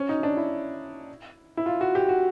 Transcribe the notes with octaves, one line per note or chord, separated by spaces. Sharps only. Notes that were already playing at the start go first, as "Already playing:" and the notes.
Already playing: C#4
D#4
D4
E4
E4
F4
F#4
G4
F#4